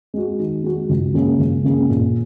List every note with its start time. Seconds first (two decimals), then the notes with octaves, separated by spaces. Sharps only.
0.14 G#3 F#4
0.39 D#3
0.64 G#3 F#4
0.89 C#2
1.14 C#3 A#3 C#4 G#4
1.39 C#2
1.64 C#3 A#3 C#4 G#4
1.90 A#2